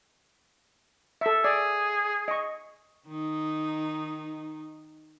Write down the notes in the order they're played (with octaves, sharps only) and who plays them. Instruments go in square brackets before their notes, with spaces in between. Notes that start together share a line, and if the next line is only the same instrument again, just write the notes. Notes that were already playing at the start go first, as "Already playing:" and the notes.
[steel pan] A4 E5
[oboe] G#4 [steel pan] D5
[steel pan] D#5 C#6
[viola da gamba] D#3 D#4